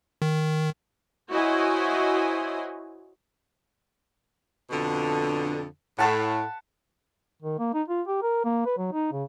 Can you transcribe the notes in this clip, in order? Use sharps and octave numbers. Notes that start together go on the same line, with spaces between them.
D#3
E4 F#4 C5 C#5 D#5 G#5
F2 B2 D3
A2 F#5 A5 B5
D#3
A#3
D#4
F4
G4
A#4
A#3
B4
F#3
D#4
C#3